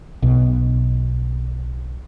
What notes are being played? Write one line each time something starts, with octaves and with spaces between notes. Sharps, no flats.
B1 B2